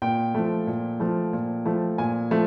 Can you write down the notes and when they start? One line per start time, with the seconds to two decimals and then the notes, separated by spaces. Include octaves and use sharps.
0.02 A#2 G5
0.35 F3 A3
0.67 A#2
1.00 F3 A3
1.33 A#2
1.66 F3 A3
1.98 A#2 G#5
2.31 F3 A3